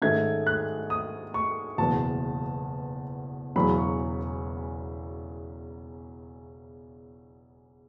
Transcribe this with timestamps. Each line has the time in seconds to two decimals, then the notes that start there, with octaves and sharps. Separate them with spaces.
0.02 G#2 D#3 A3 C#4 G#6
0.47 F#6
0.90 D#6
1.34 C#6
1.78 F#1 E2 B2 A5
3.56 E1 E2 C#3 F#3 C#4 B5
3.78 C#6